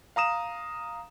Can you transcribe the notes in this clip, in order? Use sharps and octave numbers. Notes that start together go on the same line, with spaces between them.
F5 A#5 D#6 E7